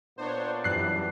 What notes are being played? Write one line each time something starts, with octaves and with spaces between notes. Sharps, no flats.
A#2 B3 D4 C5 C#5
F#2 E3 G3 F#6 C7